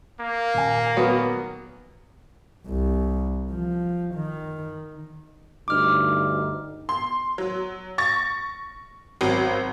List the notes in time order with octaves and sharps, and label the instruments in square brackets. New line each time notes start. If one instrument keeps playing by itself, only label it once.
[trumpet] A#3
[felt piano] D#1 G#5
[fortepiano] D#3 F#3 B3
[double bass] C2
F3
D#3
[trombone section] D2 G2 D#4 [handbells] D6 F6
[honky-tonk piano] C6
F#3
C#6 A6 A#6
G#1 F#3